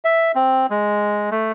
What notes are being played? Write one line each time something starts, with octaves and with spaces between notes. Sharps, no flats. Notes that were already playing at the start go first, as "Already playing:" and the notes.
E5
C4
G#3
A3